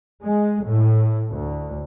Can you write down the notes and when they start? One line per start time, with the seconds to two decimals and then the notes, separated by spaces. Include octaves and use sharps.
0.22 G#3
0.65 A2
1.33 D2